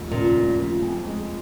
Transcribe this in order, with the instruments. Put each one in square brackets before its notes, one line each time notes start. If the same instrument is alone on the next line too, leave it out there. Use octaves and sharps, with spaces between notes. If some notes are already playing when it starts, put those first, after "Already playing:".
Already playing: [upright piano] F1 D#2 F3
[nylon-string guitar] A#2 [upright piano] C#3
[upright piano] F1
F3
F2
G#3